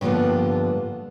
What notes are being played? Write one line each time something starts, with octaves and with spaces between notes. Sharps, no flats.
G2 D3 F3 A#3 B3